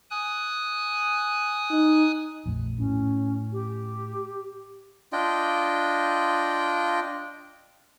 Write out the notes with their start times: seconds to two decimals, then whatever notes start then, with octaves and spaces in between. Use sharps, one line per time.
0.11 G#5 D#6 F#6
1.71 D#4
2.46 A#1 F2 A3
2.78 A2 C#4
3.53 G4
5.13 D4 F4 D#5 G5